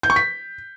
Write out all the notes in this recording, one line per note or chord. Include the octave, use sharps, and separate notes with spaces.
G6
C#6
B6